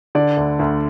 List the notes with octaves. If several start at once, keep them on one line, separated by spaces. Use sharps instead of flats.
D3 D5
D2
D2